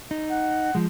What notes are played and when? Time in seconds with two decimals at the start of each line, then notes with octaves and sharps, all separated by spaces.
0.11 D#4
0.30 F#5
0.75 F3 G#3